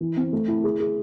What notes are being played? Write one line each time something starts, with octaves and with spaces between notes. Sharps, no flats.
E3
C4
A3
E4
G#4
G#4